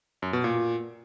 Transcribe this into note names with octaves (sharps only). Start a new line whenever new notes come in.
F#2
B2
A#2